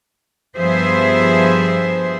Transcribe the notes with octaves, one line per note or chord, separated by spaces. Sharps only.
G2 F3 B3 G#4 C5 E5